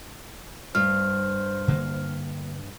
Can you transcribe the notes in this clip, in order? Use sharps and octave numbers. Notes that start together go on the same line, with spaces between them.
G2 C5 F6
D3 F#3 A#3